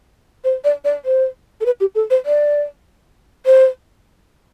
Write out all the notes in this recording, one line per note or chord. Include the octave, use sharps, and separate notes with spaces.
C5
D5
D5
C5
A4
B4
G4
A4
C5
D5
C5